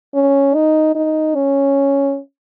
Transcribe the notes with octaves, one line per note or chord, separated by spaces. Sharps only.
C#4
D#4
D#4
C#4